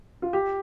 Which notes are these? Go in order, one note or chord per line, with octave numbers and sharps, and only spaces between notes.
F4
G4